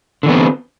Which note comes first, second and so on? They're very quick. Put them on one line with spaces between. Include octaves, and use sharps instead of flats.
D3 E3 B3 C4